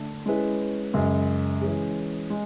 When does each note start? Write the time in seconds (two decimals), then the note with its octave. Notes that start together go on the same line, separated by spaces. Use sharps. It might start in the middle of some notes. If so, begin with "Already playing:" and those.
Already playing: D3 A3 D4 A4
0.26 G#3 C#4 E4 G#4 B4
0.94 F#2 C#3 G#3
1.62 E3 G#3 C#4 G#4
2.30 G#3